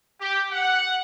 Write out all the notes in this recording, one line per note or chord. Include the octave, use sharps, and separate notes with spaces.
G4
F#5